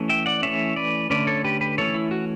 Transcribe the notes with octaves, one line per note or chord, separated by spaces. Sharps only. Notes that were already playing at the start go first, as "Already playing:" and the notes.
Already playing: E3 A3 C#4
E5 G5
D5 F#5
E3 A3 C#4 C#5 E5
B4 D5
D3 A3 C#4 B4 D5
A4 C#5
G4 B4
G4 B4
E3 A3 C#4 A4 C#5
E4
F#4